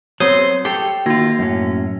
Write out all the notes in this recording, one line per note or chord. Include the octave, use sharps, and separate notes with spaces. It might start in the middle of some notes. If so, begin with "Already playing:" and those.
F#3 B3 C4 C5 C#5 D#6 D#7
G4 A4 C#5 G5 C7
D#3 A#3 F4 F#4 A#6
F#2 A2 C#4